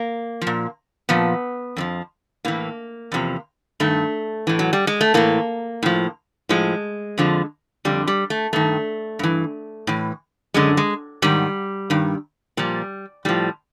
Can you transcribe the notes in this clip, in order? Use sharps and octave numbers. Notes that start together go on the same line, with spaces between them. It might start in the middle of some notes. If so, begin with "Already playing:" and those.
Already playing: A#3
F3
A#2
A#2 F3 B3
F2 D3 F3
A2 E3 A#3
E2 C3 F3
G2 D#3 A3
A2 E3
F#3
G3
G#3
A3
A2 E3 A#3
A2 F3
A2 F3 G#3
F2 D3 F3
F2 D3 G3
G3
A3
G2 D#3 A3
G2 E3
A2 E3
F#2 D3 G#3
G#3
G#2 D#3 G3
G2 D#3
A#2 F3 G3
A2 F3 G3